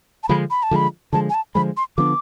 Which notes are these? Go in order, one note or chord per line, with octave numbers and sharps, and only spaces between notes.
A5
D3 F3 G#3 B5
B5
A5
D3 F3 G#3 B5
D3 F3 G#3 A5
G#5
A5
D3 F3 G#3 B5
C6
D3 F3 B3 D4 D6